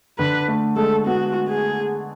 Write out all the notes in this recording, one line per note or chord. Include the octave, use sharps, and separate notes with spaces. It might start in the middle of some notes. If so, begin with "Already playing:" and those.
D3 B4
A3
G#3 A4
B3 F#4
G#4